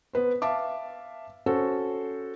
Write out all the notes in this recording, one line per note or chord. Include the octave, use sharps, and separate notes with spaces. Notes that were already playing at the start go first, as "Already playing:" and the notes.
B3 B4 C5
E5 F5 A5 D6
C#4 F#4 A4 C5